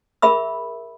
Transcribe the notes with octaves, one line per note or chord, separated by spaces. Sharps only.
G#4 A#4 E5 B5 E6